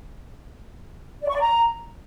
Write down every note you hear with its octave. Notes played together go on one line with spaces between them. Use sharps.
D5
C#6
D5
A#5